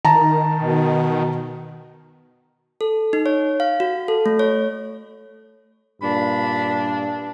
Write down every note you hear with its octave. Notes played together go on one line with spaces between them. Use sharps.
D#3 A5 A#5
B2
A4
D#4
C#5
F5
F#4
A4
A3
C#5
G2 A#2 D4 B5